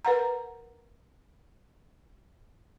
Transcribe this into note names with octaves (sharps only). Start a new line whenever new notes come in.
A#4 B4 F#5 A#5